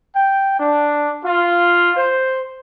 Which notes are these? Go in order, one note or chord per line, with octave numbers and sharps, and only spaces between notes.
G5
D4
F4
C5